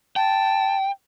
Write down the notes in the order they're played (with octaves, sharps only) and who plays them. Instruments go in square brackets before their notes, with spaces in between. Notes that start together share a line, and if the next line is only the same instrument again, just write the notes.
[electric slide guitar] G5 [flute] A5